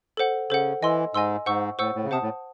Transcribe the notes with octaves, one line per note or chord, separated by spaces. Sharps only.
A4 C5 F#5
C#3 A4 C5 F#5
E3 D#5 G#5 C6 E6
G#2 D#5 G#5 C6 E6
G#2 C5 F#5 C#6 E6
A2 C5 F#5 C#6 E6
A2
C#3
C3 C5 F#5 A5 D#6
A2